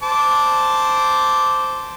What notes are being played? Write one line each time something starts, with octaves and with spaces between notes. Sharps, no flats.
C5 A5 D6